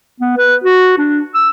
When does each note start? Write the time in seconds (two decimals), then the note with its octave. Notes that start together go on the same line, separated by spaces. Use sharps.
0.20 B3
0.37 B4
0.64 F#4
0.98 D4
1.34 E6